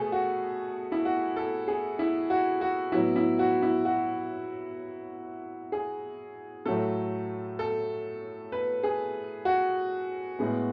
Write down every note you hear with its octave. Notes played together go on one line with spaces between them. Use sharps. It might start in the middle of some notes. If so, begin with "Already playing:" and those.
Already playing: B2 A3 G#4 A4 B4
F#4
E4
F#4
A4
G#4
E4
F#4
F#4
A2 F#3 B3 E4
E4
F#4
E4
F#4
G#4
A2 F#3 A3 A4
A4
B4
G#4
F#4
A2 G#3 B3